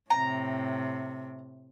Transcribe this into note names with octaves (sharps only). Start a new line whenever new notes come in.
A2 C3 A#5